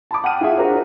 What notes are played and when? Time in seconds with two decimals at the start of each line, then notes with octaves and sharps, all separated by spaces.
0.11 A5 B5 D6
0.24 F#5 G5 F6 D#7
0.41 E4 F4 G#4 E5 F#5
0.58 D4 F#4 A#4 C5